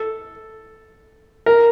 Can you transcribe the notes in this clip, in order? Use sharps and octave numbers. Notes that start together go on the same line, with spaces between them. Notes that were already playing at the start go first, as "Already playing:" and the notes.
Already playing: A4
A#4